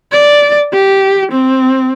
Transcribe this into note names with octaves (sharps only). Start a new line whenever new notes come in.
D5
G4
C4